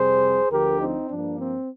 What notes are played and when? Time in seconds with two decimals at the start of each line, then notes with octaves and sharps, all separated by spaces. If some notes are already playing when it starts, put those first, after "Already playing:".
Already playing: F2 C3 G3 C4 G#4 C5
0.50 D2 D3 F3 G4 A#4
0.79 C4 D#4
1.09 G2 F3 A#3 D4
1.39 C4